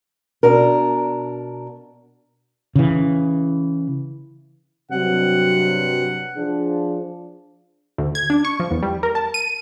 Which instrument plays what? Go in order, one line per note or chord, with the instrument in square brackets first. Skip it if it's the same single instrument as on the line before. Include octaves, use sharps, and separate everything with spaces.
[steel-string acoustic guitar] B2 D4 A#4
[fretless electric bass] C#3 E3
[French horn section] G2 C3 F#3 [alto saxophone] F#5
[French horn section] F3 D4 G#4
[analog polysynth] D2
G#6
D4
C#6
F3
E2
G3
A#4
A5
D#7